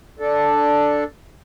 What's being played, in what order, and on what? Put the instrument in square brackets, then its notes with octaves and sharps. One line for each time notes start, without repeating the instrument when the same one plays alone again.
[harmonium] D4 A4